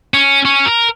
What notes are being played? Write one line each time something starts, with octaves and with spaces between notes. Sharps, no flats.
C#4
C#4
A#4